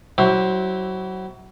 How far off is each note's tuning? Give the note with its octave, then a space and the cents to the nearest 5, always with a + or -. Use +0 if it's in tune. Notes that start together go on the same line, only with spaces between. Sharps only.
F#3 +25 E4 -15 C5 +25